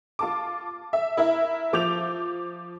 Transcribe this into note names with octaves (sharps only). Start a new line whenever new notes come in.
F4 A5 D6
E5
E4 A#4 E5
F3 D6 G6 F7